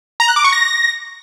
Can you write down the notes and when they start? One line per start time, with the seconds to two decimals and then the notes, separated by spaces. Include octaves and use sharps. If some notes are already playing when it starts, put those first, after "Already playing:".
0.20 A#5
0.28 F#6
0.36 D6
0.44 C#6
0.52 A#6